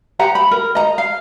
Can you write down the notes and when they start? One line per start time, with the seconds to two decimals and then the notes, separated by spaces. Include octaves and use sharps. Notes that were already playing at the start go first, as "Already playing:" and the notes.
0.19 G4 F#5 A#5
0.35 B5
0.51 A#4
0.75 D#5 A#5
0.98 F5